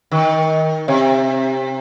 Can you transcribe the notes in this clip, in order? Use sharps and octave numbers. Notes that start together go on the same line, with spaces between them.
D#3
C3